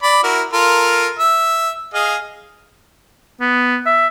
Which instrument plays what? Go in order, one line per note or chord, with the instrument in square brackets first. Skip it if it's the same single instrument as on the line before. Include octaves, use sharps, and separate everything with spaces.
[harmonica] D5 B5
E4 F#4 A#4
F4 A4 A#4
E5
G#4 D#5 F5
[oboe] B3
E5